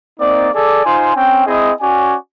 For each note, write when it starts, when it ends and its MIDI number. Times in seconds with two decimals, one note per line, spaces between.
0.20 0.50 58
0.20 0.50 60
0.20 0.50 63
0.20 0.50 74
0.54 0.82 68
0.54 0.82 69
0.54 0.82 74
0.85 1.13 63
0.85 1.13 65
0.85 1.13 72
0.85 1.13 80
0.85 1.13 84
1.15 1.44 60
1.15 1.44 61
1.15 1.44 79
1.46 1.72 60
1.46 1.72 64
1.46 1.72 68
1.46 1.72 75
1.81 2.16 61
1.81 2.16 66
1.81 2.16 74
1.81 2.16 80